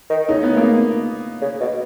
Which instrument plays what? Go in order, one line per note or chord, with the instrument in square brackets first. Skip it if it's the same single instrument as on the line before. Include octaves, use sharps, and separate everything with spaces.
[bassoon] D#3
[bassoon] C#3 [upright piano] D#4
[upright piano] B3
A#3
[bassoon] C#3
B2